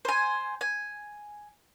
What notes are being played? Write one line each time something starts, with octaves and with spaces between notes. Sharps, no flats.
C5 G#5
G#5